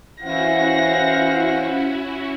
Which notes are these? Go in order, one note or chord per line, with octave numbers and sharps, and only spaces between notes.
E3 C#4 E4 F#4 C5 F5 F#5 A#6